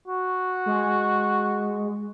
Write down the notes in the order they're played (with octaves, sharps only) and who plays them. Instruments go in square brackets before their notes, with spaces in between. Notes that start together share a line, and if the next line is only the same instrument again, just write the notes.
[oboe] F#4
[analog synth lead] G#3